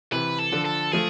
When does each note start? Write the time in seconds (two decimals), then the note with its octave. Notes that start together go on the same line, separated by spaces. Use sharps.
0.12 C3 E3 B4
0.39 A4
0.52 D3 F3
0.65 A4
0.92 F3 A3 G#4